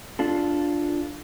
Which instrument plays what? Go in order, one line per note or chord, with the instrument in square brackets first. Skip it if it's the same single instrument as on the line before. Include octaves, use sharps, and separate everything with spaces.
[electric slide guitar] D4 F4 A4